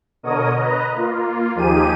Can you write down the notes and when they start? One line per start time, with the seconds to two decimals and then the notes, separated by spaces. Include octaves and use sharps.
0.23 B2 D3 A#4 C#5 D#5 D#6
0.57 B4 D#5 A#5
0.95 A#3 F4
1.55 D#2 F3 D#4 G4 G#4 D#7